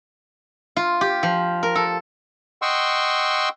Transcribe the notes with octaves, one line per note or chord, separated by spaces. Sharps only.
F4
G4
F3
A#4
A4
D#5 F#5 G5 C6 C#6 E6